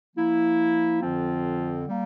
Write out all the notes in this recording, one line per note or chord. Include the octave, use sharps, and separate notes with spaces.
F3 A#3 E4
F2 D3 F3 C4 F4
G3 A#3